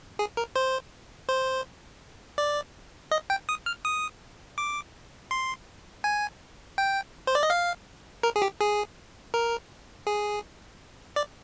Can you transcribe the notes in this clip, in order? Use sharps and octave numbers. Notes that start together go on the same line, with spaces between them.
G#4
A#4
C5
C5
D5
D#5
G5
D#6
F6
D#6
D6
C6
G#5
G5
C5
D5
D#5
F5
A#4
G#4
G4
G#4
A#4
G#4
D5